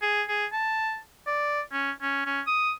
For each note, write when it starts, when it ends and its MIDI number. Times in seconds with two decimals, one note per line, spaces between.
0.02 0.23 68
0.28 0.46 68
0.52 0.98 81
1.27 1.61 74
1.72 1.91 61
2.01 2.22 61
2.26 2.41 61
2.47 2.72 87